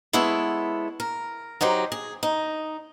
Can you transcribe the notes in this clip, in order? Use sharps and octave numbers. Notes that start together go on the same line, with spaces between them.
G#3 B3 E4 A4 C#5
A#4
F#3 D#4 G4 C5
G#4
D#4